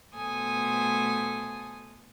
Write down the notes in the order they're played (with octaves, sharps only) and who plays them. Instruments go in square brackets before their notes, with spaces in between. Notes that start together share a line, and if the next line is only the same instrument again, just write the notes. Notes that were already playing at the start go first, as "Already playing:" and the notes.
[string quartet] B2 A3 A4 C5 G#5 D#6